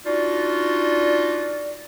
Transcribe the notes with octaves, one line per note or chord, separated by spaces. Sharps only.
D4 D#4 F4 F#4 D5